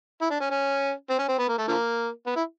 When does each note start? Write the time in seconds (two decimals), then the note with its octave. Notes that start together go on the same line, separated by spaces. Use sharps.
0.21 E4
0.30 D4
0.40 C#4
0.50 C#4
1.10 C4
1.18 C#4
1.28 C4
1.39 B3
1.48 A#3
1.58 A3
1.68 D3 F3 A#3
2.26 B3
2.36 E4